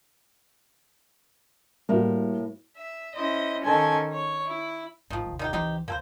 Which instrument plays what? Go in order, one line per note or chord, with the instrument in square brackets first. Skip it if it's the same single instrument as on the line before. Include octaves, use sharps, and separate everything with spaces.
[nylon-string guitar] A2 A#3 [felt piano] G3 A3 F#4
[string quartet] E5
C#4 E4 C5 D#5
D#3 C#4 A4 C5 G#5 C#6
C#5
E4
[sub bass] G#1 [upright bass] G#2 [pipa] D#3 F3
[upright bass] D#2 C3
[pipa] D#3 D#4 G4
[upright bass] C#2 [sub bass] E3 [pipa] C4 D#4 G4
[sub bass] D2 [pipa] A#3 A4 C5